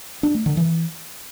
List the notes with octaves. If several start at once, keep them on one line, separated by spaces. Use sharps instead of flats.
D4
A3
D3
E3